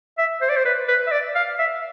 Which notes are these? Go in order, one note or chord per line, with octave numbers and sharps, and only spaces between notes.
E5
C5
D5
C5
B4
B4
E5
D5
F5
E5